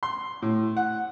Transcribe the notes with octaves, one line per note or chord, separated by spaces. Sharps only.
C6
A2
F#5